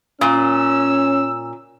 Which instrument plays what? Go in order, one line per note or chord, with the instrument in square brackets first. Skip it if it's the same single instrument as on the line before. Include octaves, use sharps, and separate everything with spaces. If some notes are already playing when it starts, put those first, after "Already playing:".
[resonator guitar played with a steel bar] A#2 [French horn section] C#4 [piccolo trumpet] E6